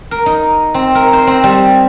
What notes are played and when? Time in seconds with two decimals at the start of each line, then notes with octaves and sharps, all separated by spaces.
0.11 A#4
0.26 D#4
0.74 C4
0.95 A#4
1.13 C5
1.27 C4
1.44 G3